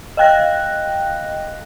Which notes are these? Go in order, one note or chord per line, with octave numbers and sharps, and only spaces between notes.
D#5 F5 G5 F#6 A#6